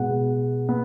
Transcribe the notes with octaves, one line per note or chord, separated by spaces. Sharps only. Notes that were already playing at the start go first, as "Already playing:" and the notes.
Already playing: B2 G#3 B3 F#5
B3